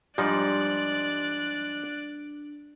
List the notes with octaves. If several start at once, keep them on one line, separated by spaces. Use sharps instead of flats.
G#2 F3 G3 D4 D#4 D5 F#6